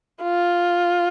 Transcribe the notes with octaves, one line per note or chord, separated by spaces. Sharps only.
F4